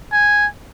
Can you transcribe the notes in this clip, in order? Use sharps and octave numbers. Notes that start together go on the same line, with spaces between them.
G#5